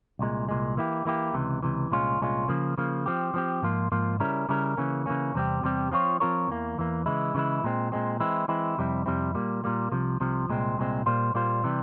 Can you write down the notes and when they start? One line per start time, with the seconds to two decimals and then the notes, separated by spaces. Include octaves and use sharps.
0.19 C2 A#2 G#3
0.48 C2 A#2 G#3
0.77 E3 A#3 E4 G4
1.05 E3 A#3 E4 G4
1.34 C#2 C3 E3
1.62 C#2 C3 E3
1.91 C2 A#2 G#3 C#4 F4
2.21 C2 A#2 G#3 C#4 F4
2.48 C#3 F3 A#3
2.78 C#3 F3 A#3
3.06 F3 C4 G4
3.34 F3 C4 G4
3.62 G#2 F3 A#3 F4
3.92 G#2 F3 A#3 F4
4.20 C#3 G3 C#4 E4 A#4
4.49 C#3 G3 C#4 E4 A#4
4.77 C#3 E3 A#3 C#4
5.06 C#3 E3 A#3 C#4
5.34 E2 C3 G3 C4 G4
5.63 E2 C3 G3 C4 G4
5.91 F3 C4 F4 A#4 C#5
6.20 F3 C4 F4 A#4 C#5
6.48 E2 E3 A#3
6.78 E2 E3 A#3
7.06 C#3 E3 G#3 E4
7.34 C#3 E3 G#3 E4
7.64 A#2 G#3 C4
7.92 A#2 G#3 C4
8.20 E3 G#3 C4 E4
8.48 E3 G#3 C4 E4
8.78 F2 C3 G3 C4 E4
9.06 F2 C3 G3 C4 E4
9.35 A#2 G3 A#3
9.64 A#2 G3 A#3
9.92 C2 C3 F3
10.20 C2 C3 F3
10.49 C2 A#2 G#3 C4
10.78 C2 A#2 G#3 C4
11.06 A#2 G3 A#3 F4 C5
11.34 A#2 G3 A#3 F4 C5
11.64 C3 E3 G3